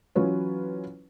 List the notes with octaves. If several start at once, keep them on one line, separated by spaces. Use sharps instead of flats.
E3 F#3 C#4 F4 B4 C#5